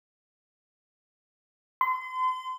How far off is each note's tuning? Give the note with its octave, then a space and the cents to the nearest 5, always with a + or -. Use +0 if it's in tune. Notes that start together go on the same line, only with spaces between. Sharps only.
C6 -35